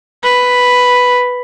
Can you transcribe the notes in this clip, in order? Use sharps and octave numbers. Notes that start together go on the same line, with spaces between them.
B4